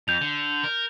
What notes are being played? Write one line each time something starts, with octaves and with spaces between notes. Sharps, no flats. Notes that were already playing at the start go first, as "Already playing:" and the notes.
F2 G6 F7
D3
A#4